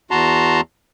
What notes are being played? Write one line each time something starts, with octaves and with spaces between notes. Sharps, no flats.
E2 F#4 A5 A#5 C6